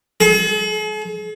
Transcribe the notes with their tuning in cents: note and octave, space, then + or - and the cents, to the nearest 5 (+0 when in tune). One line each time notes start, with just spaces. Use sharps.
G#4 +45